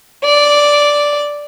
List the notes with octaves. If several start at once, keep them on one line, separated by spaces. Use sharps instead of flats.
D5